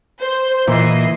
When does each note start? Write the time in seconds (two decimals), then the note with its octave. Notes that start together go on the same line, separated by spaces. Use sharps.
0.22 C5
0.68 A#2 E3 E4 D#5 C7